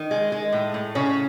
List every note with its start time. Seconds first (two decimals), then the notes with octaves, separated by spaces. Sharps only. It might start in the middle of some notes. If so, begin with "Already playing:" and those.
Already playing: D#3
0.11 G#3
0.32 G#3
0.52 A2
0.74 A2
0.95 C#3 C#4